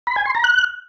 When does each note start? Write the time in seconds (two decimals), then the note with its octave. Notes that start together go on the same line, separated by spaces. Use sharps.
0.07 B5
0.16 G#5
0.25 C6
0.35 A#5
0.44 F#6